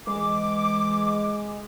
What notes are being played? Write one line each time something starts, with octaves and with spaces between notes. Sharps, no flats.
E3 G#3 D6